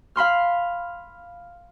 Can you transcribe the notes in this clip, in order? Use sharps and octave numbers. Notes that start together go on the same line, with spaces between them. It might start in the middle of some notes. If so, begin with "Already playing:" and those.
F5 B5 C6 F6